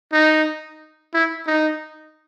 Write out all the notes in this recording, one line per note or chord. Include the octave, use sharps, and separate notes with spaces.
D#4
E4
D#4